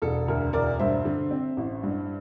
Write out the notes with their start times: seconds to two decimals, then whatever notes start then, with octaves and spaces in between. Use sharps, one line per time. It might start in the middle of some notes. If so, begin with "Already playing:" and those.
0.02 E1 A4
0.28 D2 A#4
0.53 E1 A#4 D5
0.79 G2 C5 E5
1.05 D3
1.31 C4
1.57 A1
1.83 G2